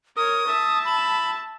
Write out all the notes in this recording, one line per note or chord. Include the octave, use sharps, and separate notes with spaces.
A#4 C#5 D#6
E5 A5
B5